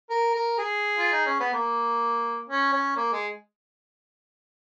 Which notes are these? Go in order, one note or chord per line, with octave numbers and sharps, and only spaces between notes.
A#4
A#4
G#4
F4
D#4
C#4
B3
A#3
C#4
C#4
A#3
G#3